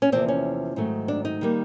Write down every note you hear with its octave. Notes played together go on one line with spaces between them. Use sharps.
C#4
E2 C3 F3 A#3 C4
C#4
G#2 D#3 F#3 A3
D4
D#4
D#3 G3 A#3